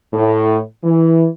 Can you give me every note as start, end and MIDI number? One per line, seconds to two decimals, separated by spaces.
0.13 0.58 45
0.84 1.26 52